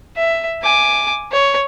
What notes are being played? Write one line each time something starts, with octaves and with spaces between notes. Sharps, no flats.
E5
G#5 D6
C#5